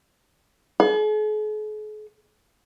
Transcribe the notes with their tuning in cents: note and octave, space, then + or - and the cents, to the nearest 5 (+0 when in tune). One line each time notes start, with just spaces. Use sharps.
G#4 +45